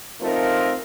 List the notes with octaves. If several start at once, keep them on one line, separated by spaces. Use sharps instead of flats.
F3 A3 C4 D#4 F4 A#4